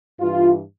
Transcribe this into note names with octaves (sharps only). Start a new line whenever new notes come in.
G2 E3 F4